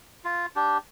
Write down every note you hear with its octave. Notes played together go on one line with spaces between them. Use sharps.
F4
D4 G4